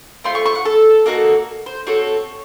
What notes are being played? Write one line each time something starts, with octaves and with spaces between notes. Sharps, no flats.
A3 C4 F4 C6
C#6
C#6
F#5
A4
A#3 D#4 F#4 A4
C5
C4 F#4 A4 C#5